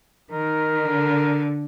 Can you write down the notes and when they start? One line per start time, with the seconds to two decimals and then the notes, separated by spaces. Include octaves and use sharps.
0.32 D#3 A#4
0.86 D3